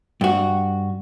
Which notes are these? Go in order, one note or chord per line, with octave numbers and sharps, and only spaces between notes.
G2 F#4